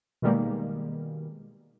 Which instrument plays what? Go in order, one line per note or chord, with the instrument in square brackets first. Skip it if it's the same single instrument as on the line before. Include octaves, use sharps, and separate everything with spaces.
[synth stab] B2 D#3 G3 G#3 A#3